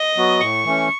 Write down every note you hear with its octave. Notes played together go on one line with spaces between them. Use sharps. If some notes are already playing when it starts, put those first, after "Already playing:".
Already playing: D#5
F#3 B3 F#4
A2 C#6
E3 A3 C#4